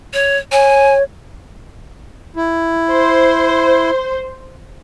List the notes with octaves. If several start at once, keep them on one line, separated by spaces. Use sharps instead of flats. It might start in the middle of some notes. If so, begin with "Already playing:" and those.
C#5
C#5 G#5
E4
C5